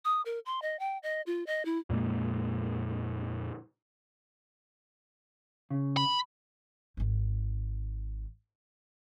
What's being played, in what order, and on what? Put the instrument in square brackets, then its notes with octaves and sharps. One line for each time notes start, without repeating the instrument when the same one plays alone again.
[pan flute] D#6
A#4
C6
D#5
G5
D#5
F4
D#5
E4
[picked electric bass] F2 A#2 G#3 A#3
[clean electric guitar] C#3
[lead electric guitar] B5
[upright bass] G#1 D#3